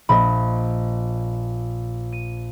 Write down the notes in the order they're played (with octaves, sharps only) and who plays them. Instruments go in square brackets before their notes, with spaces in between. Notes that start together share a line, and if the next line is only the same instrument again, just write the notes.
[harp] A#1 [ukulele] D#5 E5 B5
[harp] D#7